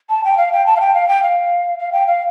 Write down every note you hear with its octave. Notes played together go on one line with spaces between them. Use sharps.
A5
G5
F5
G5
A5
F5
G5
F5
G5
F5
F5
G5
F5